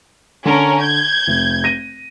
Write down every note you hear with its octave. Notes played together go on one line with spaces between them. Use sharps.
D3 C#4 A#4 A5
G6 G#6
F1
A#6 D#7